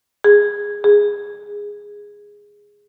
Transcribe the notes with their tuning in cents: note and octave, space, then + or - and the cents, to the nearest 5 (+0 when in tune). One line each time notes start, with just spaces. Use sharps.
G#4 -10
G#4 -10